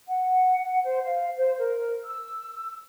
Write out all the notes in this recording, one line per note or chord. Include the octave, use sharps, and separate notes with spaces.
F#5
C5
F5
C5
A#4
E6